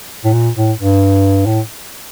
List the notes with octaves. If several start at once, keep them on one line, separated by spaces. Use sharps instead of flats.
A2
A#2
A2
G2
A2